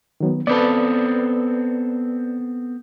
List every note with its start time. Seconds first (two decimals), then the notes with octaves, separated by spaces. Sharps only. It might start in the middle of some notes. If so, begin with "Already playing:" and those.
0.20 D#3 F#3 B3
0.47 B3 C4 A4 B4 D5